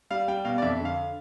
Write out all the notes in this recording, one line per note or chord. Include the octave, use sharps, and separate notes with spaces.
G3 F5
G3 G5
B2 F5
D5
F2 E5
D3
F5